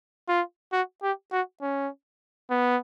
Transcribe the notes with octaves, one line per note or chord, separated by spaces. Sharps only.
F4
F#4
G4
F#4
C#4
B3